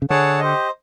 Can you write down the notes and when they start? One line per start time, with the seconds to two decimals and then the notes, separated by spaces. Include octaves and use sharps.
0.02 C#3
0.10 D3 G#4 C#5 F#5 A5
0.39 G4 C5 D#5